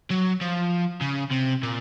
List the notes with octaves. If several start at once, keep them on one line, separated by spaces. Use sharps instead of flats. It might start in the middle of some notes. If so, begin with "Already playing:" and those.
F#3
F3
C#3
C3
A#2